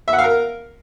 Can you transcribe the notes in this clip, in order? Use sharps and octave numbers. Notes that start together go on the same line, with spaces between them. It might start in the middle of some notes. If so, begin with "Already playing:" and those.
E5
F#5
F5
A#4